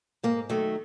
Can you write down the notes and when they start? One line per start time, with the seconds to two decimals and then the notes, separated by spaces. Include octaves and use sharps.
0.23 G#2 A#3
0.50 D#3 F#3 A3